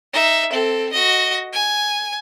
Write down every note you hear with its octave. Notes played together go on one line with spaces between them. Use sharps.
D#4 E5
C4 A4
F#4 D#5
G#5